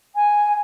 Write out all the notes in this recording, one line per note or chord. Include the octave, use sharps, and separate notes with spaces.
G#5